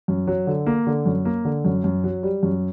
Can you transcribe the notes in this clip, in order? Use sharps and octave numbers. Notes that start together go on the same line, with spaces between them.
F#2
F#3
D3
A#3
D3
F#2
A#3
D3
F#2
F#2
F#3
G3
F#2